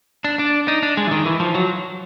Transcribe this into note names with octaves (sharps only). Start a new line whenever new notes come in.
D4
D4
D#4
D4
G#3
E3
D#3
E3
F3
F#3